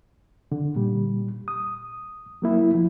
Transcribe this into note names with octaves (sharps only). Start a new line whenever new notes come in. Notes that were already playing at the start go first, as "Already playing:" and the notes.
D3
A#2 G3
D#6
F#3 A#3 E4
F3